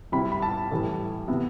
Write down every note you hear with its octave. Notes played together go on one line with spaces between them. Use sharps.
C3 G3 C4 E4 B5
B5
A5
A2 E3 G3
C3 E3 B3